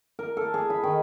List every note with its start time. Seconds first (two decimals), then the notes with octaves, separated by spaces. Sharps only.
0.19 A#4
0.37 A4
0.54 G#4
0.70 B5
0.84 D#3